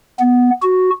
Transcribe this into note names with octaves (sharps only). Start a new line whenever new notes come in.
B3
F#4